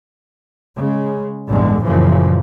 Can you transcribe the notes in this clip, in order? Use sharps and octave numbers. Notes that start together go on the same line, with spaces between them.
C#3 G#3
A1 E2 G2 D3 G#3
F#2 A#2 C#3 E3 F3